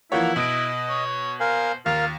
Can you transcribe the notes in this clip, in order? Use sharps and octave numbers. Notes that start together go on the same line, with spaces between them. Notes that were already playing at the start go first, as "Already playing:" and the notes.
E3 F3 A#3 E4 C#5 F#5
B2 D#5 D7
C#5
A#4 C5 F5 G#5
D#2 F4 A#4 F5 F6